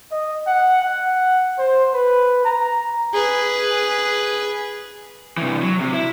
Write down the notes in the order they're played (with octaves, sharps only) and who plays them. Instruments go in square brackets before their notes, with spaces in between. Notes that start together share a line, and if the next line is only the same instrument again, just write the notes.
[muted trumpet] D#5
F#5
F#5
C5
B4
A#5
[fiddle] G#4 B4
[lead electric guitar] C3 E3
F#3
C3
E4